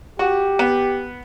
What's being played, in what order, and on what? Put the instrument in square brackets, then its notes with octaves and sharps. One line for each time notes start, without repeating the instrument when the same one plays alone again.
[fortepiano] F#4 [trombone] G4
[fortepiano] B3